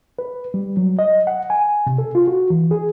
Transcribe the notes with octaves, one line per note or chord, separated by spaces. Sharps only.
B4
G3
F#3
D#5
F#5
G#5
C3
A4
F4
F#4
E3
G#4